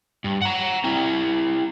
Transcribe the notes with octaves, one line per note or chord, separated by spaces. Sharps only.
G2
F#5 A#5
C4 E4